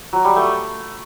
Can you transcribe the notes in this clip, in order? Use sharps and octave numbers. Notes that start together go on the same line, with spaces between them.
F#3
G3
A3